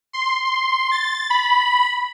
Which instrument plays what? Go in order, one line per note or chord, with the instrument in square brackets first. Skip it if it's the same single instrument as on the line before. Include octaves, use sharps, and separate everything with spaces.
[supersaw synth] C6
C6
A6
B5